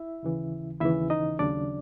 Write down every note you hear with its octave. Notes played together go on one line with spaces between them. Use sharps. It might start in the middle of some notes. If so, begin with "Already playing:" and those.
Already playing: E4 E5
D#2 C#3 E3
D#2 C#3 E3 E4 E5
D#4 D#5
D#2 C#3 F#3 D4 D5